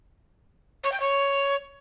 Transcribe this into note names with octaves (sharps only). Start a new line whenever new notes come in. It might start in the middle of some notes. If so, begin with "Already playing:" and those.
C#5
G5
C#5